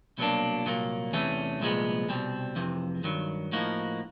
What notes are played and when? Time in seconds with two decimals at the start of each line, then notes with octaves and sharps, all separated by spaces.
0.18 C2 B2 F#3 A#3 D4
0.65 C2 A#2 F#3 A#3
1.12 E2 C3 E3 A3 C#4
1.60 C2 A#2 F3 G#3 B3
2.09 C2 B2 G3 C4
2.56 F2 C3 E3
3.04 G2 D#3 F#3
3.52 A2 F3 A#3 D#4 F#4